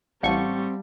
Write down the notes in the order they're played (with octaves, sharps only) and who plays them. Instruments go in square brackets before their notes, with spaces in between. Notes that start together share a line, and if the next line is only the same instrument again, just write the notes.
[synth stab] A1 C#6 [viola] G3 [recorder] C4 [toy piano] F5 F#5 A5